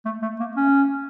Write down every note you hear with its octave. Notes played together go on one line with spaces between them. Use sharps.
A3
A3
A#3
C#4